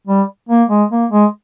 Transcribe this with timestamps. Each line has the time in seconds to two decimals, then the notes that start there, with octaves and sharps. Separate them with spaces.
0.07 G3
0.49 A#3
0.69 G#3
0.91 A#3
1.11 G#3